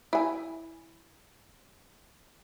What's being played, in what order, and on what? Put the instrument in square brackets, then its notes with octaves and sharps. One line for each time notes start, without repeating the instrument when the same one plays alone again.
[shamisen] E4 G#5